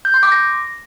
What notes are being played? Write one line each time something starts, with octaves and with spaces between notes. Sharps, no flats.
G6
C6
D6
A#6